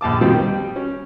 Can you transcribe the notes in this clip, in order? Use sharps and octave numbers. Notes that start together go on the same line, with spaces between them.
A#1 D#2 A5 D6
B2 D#3 F3 G3 C4 G4
G3
C#4